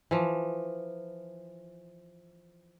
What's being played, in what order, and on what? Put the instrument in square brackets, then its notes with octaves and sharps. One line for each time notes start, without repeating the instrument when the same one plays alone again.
[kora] E3 F3